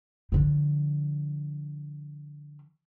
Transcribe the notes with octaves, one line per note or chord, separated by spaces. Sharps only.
D3 F3